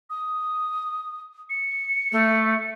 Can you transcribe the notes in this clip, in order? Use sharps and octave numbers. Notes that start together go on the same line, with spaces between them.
D#6
C#7
A3